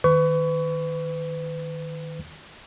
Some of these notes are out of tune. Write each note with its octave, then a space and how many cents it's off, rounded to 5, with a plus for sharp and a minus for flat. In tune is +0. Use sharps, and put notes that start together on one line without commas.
D#3 +0 B4 +35 C#6 +30